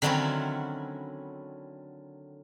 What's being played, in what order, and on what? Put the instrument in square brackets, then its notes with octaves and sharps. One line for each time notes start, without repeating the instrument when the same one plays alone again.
[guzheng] D3 D#3 F#3 C4 C#4 E4